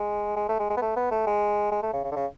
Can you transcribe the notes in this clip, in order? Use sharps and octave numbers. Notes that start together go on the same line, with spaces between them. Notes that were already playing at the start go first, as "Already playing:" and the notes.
Already playing: G#3
G#3
A3
G#3
G#3
B3
A3
B3
A3
G#3
G#3
A3
C#3
C#3
D3
C#3